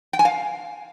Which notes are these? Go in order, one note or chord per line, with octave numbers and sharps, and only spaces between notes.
G5
G#5
F5